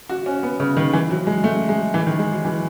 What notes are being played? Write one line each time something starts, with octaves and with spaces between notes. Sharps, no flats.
F#4
C#4
B3
C#3
D#3
E3
F#3
G#3
A3
G#3
E3
D#3
G#3
F#3
E3